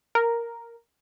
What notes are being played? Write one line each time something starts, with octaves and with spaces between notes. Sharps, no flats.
A#4